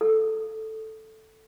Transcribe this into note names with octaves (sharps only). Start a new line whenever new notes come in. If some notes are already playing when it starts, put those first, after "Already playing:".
A4